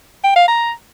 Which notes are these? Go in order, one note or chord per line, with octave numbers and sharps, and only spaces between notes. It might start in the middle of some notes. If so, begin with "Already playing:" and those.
G5
F5
A#5